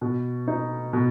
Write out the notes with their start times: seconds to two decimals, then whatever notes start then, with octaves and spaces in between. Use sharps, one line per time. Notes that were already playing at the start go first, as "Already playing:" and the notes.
0.01 B2
0.48 D#4
0.93 B2